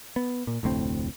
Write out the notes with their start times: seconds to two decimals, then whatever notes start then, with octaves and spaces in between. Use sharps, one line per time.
0.16 B3
0.47 A#2
0.63 F1 D2 A2 C4